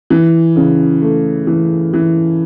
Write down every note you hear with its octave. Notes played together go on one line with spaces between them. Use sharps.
E3
C#3
A3
E3
E3